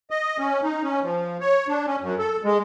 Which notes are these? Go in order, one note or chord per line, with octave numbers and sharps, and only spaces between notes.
D#5
C#4
D#4
C#4
F3
C#5
D4
C#4
F#2
A4
G#3